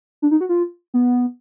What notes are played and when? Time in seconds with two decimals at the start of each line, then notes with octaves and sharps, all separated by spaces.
0.22 D4
0.31 D#4
0.41 F#4
0.49 F4
0.94 B3